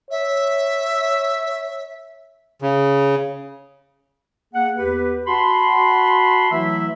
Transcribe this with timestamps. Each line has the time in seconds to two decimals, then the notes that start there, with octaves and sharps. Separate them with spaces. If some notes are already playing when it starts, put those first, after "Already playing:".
0.10 C#5 E5
2.62 C#3
4.54 A#3 G#4 F#5
4.77 E2 G4 B4
5.27 F#4 A5 B5 C6
6.52 E3 F#3 A3 E4 E5